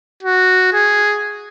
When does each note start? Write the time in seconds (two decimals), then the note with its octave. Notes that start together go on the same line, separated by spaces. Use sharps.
0.23 F#4
0.73 G#4